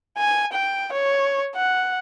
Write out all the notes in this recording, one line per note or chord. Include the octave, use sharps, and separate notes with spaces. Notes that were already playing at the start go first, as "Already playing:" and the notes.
G#5
G5
C#5
F#5